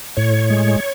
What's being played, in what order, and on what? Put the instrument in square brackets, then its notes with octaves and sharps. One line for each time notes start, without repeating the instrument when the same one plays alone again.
[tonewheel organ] A2 C#5
G#3